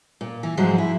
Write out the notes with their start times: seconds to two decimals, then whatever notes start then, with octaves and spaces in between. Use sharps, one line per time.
0.21 A#2
0.43 E3
0.57 G#2 F3 F#3 G#3
0.78 E4